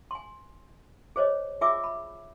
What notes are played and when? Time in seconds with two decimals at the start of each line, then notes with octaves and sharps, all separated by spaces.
0.11 G#5 C6
1.16 G#4 C5 C#5 D#5
1.61 F4 G#4 E5 G#5 D6 E6
1.84 B5